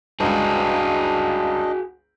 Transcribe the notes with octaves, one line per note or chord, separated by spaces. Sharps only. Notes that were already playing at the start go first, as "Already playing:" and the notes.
G1 C#2 D4 F#4 G#4 D#5